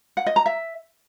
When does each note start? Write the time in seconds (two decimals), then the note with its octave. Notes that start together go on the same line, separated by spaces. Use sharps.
0.17 F#5
0.26 D#5
0.36 A#5
0.46 E5